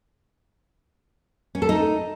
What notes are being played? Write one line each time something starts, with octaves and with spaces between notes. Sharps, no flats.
C#4
A4
D#4